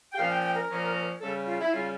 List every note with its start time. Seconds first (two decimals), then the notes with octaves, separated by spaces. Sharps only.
0.13 G5
0.18 A#2 F3 C#4 F5
0.31 G5
0.44 G5
0.57 A#4
0.70 A#2 F3 C#4
1.21 C#3 G3 C#4 A4
1.47 F4
1.60 E4
1.73 C#3 G3 C#4 F4